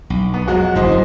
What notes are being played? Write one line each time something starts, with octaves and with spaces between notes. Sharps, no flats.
B1
B3
F2 F#3 G#3 F#4
F1 A#1 E2 E3 C5 D#5
F#2 G3